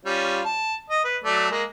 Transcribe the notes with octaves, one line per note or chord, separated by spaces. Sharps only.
G3 C#4 F4
A5
D#5
B4
F#3 A3 D5
G#3 A#3